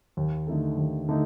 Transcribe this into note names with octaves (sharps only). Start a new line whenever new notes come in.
D#2
D3 A3 D#4 A4
D#2
D3 A3 D#4